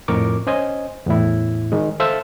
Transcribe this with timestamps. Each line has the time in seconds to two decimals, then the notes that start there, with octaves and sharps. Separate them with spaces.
0.08 F2 A2 A#4 C#6 D6
0.47 C#4 C5 D#5 G#5
1.06 E2 A2 E4
1.72 D#3 G#3
2.00 A4 C5 E5 F5 A5 E6